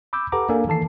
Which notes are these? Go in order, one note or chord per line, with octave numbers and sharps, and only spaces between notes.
B5 D6 E6 G6
G4 A4 B4 F#5 A#5 D6
A#3 D4 A4 A#4 F5 G#5
D#3 E3 A4 A5 C7